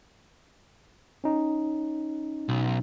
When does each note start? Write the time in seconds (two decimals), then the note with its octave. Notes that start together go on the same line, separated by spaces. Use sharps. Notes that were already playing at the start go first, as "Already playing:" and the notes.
1.24 C#4 D#4
2.49 B1